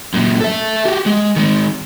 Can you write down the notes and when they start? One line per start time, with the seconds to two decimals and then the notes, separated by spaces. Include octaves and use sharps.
0.14 F#2 A#2
0.41 A4 E5
0.85 F#4 G4
1.06 G#3
1.36 D#3 G#3